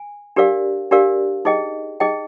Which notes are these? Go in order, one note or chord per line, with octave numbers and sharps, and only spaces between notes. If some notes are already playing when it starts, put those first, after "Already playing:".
Already playing: G#5
D4 G4 A#4 D5 F5
D4 G4 A#4 D5 F5
D#4 G#4 D#5 G5
D#4 G#4 D#5 G5